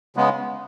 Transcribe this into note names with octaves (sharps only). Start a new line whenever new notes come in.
C#3 G#3 B3